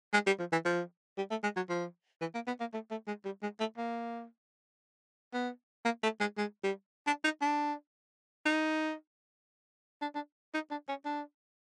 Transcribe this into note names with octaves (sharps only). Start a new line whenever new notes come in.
G#3
G3
F3
E3
F3
G3
A3
G#3
F#3
F3
E3
A#3
B3
A#3
A3
A3
G#3
G3
G#3
A3
A#3
B3
A#3
A3
G#3
G#3
G3
D4
D#4
D4
D#4
D4
D4
D#4
D4
C#4
D4